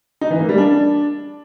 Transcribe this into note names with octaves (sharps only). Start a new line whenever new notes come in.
D#4
E3
A#3
G3
D4